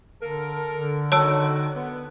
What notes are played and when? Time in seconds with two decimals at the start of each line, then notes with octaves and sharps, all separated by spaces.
0.21 D3 A4 A#4
0.72 D3
1.12 D#3 F#4 C#5 A5 E6
1.75 B3